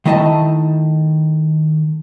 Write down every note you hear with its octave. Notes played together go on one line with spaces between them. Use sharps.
D#3 A3 E4 D#5 E5 A5